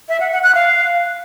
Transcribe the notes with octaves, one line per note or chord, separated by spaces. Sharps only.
E5
F#5
F#5
F#6
F5